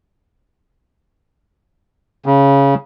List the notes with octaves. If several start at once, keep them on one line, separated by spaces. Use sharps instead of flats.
C#3